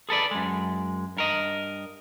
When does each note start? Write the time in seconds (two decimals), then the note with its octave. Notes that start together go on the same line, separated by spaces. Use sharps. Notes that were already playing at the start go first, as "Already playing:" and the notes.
0.09 G#4 A4 B4 D5
0.31 F#2 G#3
1.17 G2 A#4 D#5